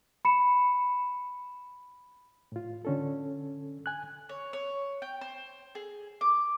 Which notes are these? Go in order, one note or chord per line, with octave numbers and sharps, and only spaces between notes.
B5 C#7 E7
A2 F4
D3 C#4 A4
G#5 F#6
C#5
C#5
G5
C5
G#4
D6